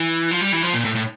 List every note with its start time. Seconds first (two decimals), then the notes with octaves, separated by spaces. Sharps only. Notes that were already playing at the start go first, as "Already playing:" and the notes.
Already playing: E3
0.31 F3
0.41 G3
0.52 E3
0.63 F3
0.73 A#2
0.85 A2
0.95 A2